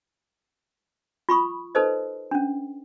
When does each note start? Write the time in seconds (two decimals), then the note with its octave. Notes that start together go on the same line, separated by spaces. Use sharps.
1.29 F4 B5 C#6 D#6
1.75 D#4 A4 B4 C5 D#5
2.31 C#4 D4